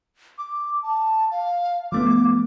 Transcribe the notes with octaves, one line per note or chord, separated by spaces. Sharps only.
D6
A5
F5
F3 A3 B3 D6